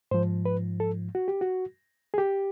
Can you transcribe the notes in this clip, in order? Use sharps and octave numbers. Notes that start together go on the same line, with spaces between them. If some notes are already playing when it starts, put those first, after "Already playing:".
G#2 F3 C5
B4
A4
F#4
G4
F#4
G#4
G4